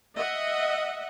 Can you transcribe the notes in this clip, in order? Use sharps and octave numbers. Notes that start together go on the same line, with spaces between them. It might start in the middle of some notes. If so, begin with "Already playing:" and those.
D#5 E5 F#5